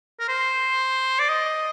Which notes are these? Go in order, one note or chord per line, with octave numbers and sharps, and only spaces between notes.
A#4
C5
D5
D#5